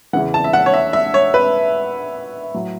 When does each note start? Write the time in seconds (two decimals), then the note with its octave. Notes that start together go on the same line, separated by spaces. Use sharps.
0.13 E2 C#3 E3 F#5
0.34 A5
0.44 E5
0.53 F#5
0.66 C#5
0.74 E5
0.93 E5
1.14 C#5
1.34 B4
2.54 A2 F#3